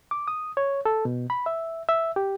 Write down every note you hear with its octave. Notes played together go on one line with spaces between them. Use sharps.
D6
D#6
C#5
A4
B2
B5
E5
E5
G4